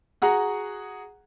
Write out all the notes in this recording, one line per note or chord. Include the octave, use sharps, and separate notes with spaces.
F#4 G#4 F#5 A#5